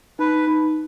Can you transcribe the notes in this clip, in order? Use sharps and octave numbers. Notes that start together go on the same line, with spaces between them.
D#4 B4
D#4